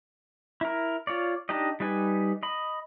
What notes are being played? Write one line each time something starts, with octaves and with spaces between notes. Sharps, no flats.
E4 A#4
F4 C#5 D5
D4 D#4 G4 D#5
G3 D#4 B4 G#5
D#5 B5